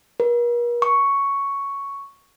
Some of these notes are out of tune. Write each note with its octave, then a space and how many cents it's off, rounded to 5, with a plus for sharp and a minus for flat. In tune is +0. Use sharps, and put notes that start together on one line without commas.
A#4 +45
C#6 +5